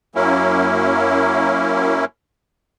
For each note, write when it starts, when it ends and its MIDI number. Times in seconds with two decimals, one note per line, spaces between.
0.15 2.05 42
0.15 2.05 54
0.15 2.05 58
0.15 2.05 61
0.15 2.05 64